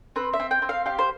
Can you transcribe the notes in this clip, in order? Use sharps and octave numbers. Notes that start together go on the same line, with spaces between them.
C4 B4
E5
C4
G5
C4
F5
G4 F5
C5